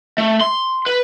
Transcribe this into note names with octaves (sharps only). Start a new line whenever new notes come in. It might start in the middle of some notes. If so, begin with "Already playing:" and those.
A3
C6
B4